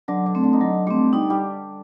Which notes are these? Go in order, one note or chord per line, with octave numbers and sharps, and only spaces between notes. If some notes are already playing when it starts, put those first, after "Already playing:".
D3 F#3 D4
D3 D4
A3 C4
D3 D4
D#4
D3 F#3 D4
G3 A3 C4 G4
G3 D#4 G4
G3 G4